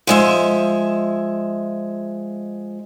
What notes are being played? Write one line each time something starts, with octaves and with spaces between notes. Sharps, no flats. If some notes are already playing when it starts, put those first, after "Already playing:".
F3 G#3 E5